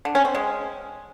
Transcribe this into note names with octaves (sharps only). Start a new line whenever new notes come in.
D3
C#4
C4
G#3